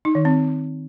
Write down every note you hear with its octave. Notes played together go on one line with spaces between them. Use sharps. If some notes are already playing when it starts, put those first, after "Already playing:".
D#4
D#3
C4